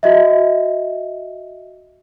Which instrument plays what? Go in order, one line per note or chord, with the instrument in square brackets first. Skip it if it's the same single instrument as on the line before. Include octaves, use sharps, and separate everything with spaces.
[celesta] F#4 D#5 E5